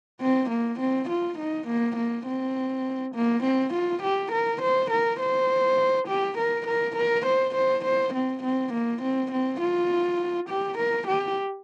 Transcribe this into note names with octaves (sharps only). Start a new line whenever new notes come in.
C4
A#3
C4
F4
D#4
A#3
A#3
C4
A#3
C4
F4
G4
A#4
C5
A#4
C5
G4
A#4
A#4
A#4
C5
C5
C5
C4
C4
A#3
C4
C4
F4
G4
A#4
G4